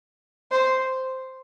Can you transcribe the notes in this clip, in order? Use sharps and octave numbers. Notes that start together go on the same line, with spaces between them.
C5